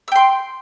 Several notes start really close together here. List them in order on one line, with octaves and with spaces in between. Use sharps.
E6 G5 C6